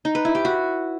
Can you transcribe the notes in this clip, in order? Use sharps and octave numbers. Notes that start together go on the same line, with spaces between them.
D#4
B4
E4
G4
F#4